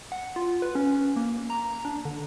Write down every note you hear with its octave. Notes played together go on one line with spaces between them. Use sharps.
F#5
F4
B4
C#4
A#3
A#5
D4
D3